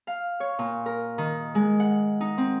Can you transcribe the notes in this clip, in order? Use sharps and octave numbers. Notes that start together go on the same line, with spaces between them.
F5
C#5
A#2
A#4
D#3
G#3
F#5
D#4
C4